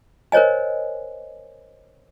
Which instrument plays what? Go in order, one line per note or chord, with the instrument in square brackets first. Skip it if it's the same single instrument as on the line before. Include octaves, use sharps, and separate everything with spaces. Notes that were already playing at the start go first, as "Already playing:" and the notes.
[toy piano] A#4 C5 C#5 D#5 G#5